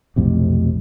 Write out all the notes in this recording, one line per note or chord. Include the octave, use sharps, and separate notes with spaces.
B1 F2 A2 C3